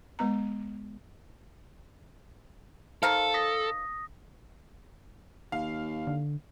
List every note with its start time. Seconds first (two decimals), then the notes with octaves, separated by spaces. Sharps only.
0.19 G#3 B3 A#5
3.03 D#3 A4 C5 F5
3.34 D#6 A#6 B6
5.52 D#2 F5
6.07 D3